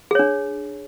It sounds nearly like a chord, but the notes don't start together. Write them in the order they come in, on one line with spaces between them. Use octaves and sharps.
G#4 C#5 D4